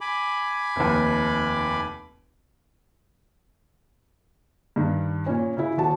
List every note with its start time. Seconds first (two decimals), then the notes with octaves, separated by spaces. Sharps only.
0.01 G#5 B5 D6
0.76 F1 D#2
4.76 G2 D#3
5.26 A#2 C#4
5.57 C#3 E4
5.77 D#1 F#4 A5